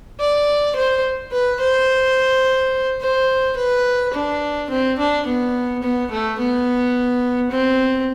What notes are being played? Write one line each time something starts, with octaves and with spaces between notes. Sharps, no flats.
D5
C5
B4
C5
C5
B4
D4
C4
D4
B3
B3
A3
B3
C4